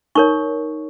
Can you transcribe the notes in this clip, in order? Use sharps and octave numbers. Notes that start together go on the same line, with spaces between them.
D#4 A#4 C#5 C#6